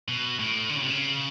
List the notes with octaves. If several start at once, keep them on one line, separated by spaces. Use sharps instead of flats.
B2
A2
D3
C#3
C3
C#3